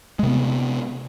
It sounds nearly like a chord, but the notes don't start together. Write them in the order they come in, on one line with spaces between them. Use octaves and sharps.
G#3 C3 B3